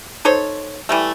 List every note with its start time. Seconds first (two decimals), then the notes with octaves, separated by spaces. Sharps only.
0.25 D#4 A4 C5 C#5
0.89 E3 G3 A3